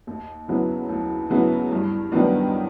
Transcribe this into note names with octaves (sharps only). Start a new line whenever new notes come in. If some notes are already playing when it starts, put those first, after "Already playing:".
D#2
C#3 F#3 B3 E4
D#2
C#3 F#3 B3 E4
G2
D#3 F#3 B3 D4